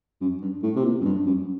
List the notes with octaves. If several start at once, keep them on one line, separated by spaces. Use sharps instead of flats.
F#2
G2
A2
C3
A#2
F#2
G2
F#2